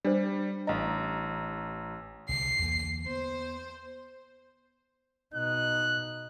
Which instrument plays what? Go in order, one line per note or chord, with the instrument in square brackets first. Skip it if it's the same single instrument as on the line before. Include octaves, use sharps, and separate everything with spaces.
[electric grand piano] G3 [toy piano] D4 C5
[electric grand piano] A1 A#5 [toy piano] D#5 F5
[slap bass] C2 D3 [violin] C7
[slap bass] E2 D3 A#3
[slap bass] B3 [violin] C5
[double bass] B2 D#4 [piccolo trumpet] F#6